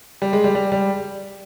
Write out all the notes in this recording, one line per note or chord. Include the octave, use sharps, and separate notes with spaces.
G3
G#3
G3
G3
G3